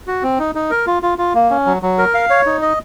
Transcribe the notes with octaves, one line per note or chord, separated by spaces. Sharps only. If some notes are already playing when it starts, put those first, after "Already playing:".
F#4
C4
D#4
D#4
A#4
F4
F4
F4
A#3
C#4
F#3
F#3
A#4
F5
C#5
D#4
D#5